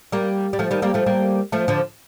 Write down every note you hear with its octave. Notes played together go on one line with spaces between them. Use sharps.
G3 A#3
G3
F3 A3
D#3 G3
G3 A#3
F3 A3
G3 A#3
F3 A3
D3 F3